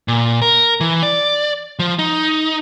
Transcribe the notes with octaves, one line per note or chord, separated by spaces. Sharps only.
A#2
A#4
E3
D5
F3
D#4